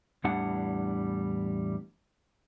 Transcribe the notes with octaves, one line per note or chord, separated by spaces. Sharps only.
E2 A2 E3 G3 D4 F#5